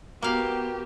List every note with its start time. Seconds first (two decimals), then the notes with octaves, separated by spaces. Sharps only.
0.22 A#3 B3 F#4 G4 F5